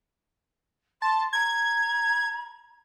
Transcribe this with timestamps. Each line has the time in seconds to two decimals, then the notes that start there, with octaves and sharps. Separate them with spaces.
1.02 A5 C6
1.33 A#5 G#6